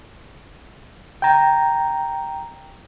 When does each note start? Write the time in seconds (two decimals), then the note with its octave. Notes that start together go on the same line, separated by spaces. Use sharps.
1.22 G5 A#5